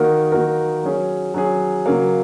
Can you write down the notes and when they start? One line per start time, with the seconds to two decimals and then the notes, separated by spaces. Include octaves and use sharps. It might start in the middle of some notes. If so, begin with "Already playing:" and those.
Already playing: D#3 A#3 D#4 F#4 A#4
0.32 D#3 A#3 D#4 F#4 A#4
0.83 F#3 C#4 G#4
1.34 F#3 C#4 G#4
1.86 C#3 F#3 A#3